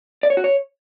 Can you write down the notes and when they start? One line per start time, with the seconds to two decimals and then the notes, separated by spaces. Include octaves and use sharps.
0.23 D5
0.30 C#5
0.37 F#4
0.44 C#5